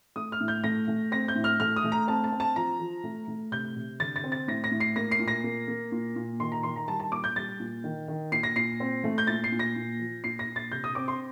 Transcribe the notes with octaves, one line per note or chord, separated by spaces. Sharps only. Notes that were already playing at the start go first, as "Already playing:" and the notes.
A3 D#6
F6
A2
G6
A3 A#6
A3
C4 A#6
G6
A2
F6
A3 F6
D#6
A3
A#5
C4 A5
A5
C4
A5
F3 A#5
F3
A3
A3
C3 G6
C3
D3 A6
A6
C4
A6
A2 A#6
A#6
A2
C7
A#3 A#6
C7
A#2
A#6
A#3
A#3
A#2
A#2
D#3 C6
A#5
D#3 C6
A#5
G3 A5
A5
A#2 D6
G6
G3 A6
A#2
D#3
D#3
A#2 C7
A#6
A#2 C7
C4
A3
G6
A#2 A6
C7
A#2
A#6
A#2
F3
A#2 C7
A#6
A#2
A6
C3 G6
D#6
C4 D6
C6